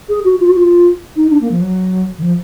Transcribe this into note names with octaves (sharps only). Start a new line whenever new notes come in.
G#4
F#4
F4
F#4
F4
D#4
D4
A#3
F3
F#3
D#3
F3